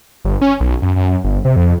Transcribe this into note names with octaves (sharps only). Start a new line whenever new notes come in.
G1
C#4
B1
F#2
F#2
G1
C3
F2